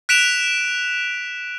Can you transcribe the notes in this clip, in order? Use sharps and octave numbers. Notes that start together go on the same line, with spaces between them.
F#6 B6 D7 E7 F7